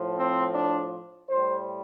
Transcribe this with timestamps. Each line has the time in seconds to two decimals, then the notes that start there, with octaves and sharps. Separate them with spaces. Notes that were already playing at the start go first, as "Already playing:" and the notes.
Already playing: A2 F3
0.17 C4
0.54 D4
1.29 A2 G3 C5